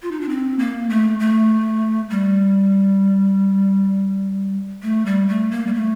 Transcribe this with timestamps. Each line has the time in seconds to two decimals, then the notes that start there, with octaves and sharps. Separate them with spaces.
0.02 F4
0.11 D#4
0.21 D4
0.29 C4
0.59 A#3
0.90 A3
1.20 A3
2.10 G3
4.83 A3
5.06 G3
5.28 A3
5.51 A#3
5.67 G3
5.74 A3